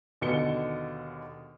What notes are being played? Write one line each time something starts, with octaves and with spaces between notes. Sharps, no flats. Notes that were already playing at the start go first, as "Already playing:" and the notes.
D#2 B2 D3 C#7 G7